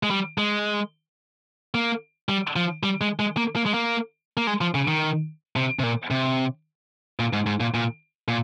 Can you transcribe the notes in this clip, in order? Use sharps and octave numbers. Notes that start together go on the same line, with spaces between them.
G#3
G3
G#3
A#3
G3
F3
G3
G#3
G#3
A#3
A#3
G#3
A#3
A#3
G#3
F3
C#3
D#3
C3
C3
A#2
C3
A#2
G#2
G#2
A#2
A#2
A#2